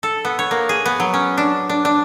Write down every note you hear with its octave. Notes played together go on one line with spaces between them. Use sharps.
A4
B3
C#5
A#3
G#4
B3
F#3
C#4
D4
D4
D4